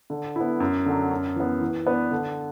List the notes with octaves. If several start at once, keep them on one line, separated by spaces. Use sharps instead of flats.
D3
B3 E4
F#2
D3 F#3
F#2
E3 B3
E3
B3 D4 B4
D3